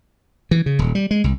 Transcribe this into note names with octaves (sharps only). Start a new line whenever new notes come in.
E3
C#3
D#1
G3
G#3
C2